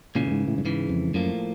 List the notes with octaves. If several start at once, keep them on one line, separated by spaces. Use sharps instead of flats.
C#2 A#2 C#3 E3
A2
G#2
A2
G2
C#2 G#2 C#3 E3
F2
F#2 A2 F3 A#3